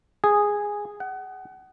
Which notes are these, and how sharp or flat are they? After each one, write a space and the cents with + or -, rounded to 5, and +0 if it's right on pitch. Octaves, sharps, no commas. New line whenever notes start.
G#4 -10
F#5 +30